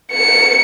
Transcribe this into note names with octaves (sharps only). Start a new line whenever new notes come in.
C#7